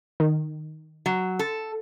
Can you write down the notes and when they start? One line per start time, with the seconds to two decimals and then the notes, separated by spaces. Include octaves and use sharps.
0.20 D#3
1.06 F#3
1.39 A4